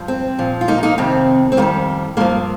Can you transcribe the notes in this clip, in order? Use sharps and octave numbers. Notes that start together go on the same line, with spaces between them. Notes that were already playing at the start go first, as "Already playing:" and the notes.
Already playing: G2 F3
C4
A#2 F3
F4
A#3 D#4
A#3 D#4
F2 C3 D#3 C4
C4
F2 D#3 G3 A#3
G2 F3 A#3